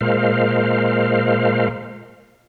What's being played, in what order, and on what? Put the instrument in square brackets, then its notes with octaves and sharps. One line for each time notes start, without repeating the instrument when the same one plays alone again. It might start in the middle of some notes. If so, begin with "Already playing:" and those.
[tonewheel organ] A#2 G#3 A#4 C5 F5